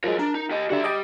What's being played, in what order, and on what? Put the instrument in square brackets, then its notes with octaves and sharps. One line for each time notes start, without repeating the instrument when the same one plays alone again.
[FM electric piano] F3 F#3 G#3 [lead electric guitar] A#4 C#5
[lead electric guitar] D4 [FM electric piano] A#4
[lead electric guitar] D#4
G4 D#5
[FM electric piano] D3 G3 [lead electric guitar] F#4 E5
[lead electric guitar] G3 G4 [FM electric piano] D#5 D6